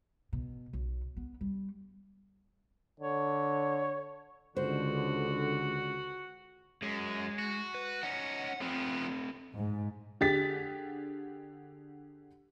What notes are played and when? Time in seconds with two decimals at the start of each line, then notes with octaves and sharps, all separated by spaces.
0.33 B2
0.73 B1
1.17 B3
1.41 G3
3.00 D3 C#5
4.56 C#2 D3 F#4 C5
6.82 F#2 G#3
7.39 F#4
7.75 B4
8.03 C#4 D#4 F#5
8.61 F3 A3 B3 C4
9.54 G#2
10.21 D3 G4 G#4 A6 B6